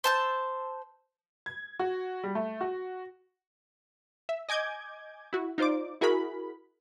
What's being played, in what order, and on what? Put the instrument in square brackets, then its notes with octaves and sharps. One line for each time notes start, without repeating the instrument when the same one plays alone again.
[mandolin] C5 A5 E6
[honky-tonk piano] G#6
F#4
G3
A3
F#4
[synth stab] E5
D#5 G#5 D6 G6 G#6
E4 F#4
D#4 F4 C5 D5 D6
E4 F#4 G#4 A#4 B5